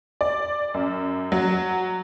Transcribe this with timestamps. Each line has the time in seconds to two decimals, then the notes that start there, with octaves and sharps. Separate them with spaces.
0.21 D5
0.74 F#2
1.32 F#3